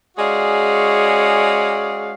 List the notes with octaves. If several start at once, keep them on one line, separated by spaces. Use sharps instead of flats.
G#3 C#4 F#4 G#4 D5 F5